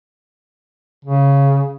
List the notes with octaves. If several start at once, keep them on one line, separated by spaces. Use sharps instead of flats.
C#3